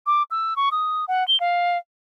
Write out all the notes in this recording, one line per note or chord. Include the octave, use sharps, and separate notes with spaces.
D6
E6
C#6
D#6
F#5
G7
F5